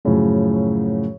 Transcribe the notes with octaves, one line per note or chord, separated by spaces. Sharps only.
F#2 A2 C#3 F3